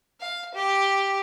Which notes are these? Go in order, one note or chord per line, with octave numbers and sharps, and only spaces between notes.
F5
G4